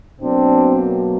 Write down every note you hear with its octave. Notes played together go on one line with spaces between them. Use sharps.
B2 F#3 A#3 C4 D4